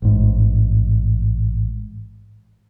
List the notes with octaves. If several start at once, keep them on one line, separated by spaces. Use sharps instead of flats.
A1 G#2